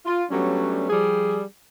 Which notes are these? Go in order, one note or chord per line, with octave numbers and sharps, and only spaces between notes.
F4
F#3 G3 A3 B3 C#4 D4
F3 G3 G#4